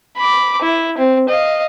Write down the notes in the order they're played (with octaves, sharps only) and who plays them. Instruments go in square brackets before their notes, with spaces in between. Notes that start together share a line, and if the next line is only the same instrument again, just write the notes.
[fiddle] B5 D6
E4
C4
D#5 F5